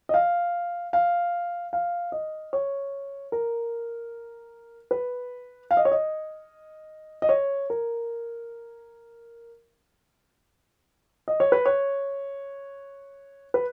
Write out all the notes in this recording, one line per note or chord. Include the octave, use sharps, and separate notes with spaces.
D#5
F5
F5
F5
D#5
C#5
A#4
B4
F5
D#5
C#5
D#5
D#5
C#5
A#4
D#5
C#5
B4
C#5
B4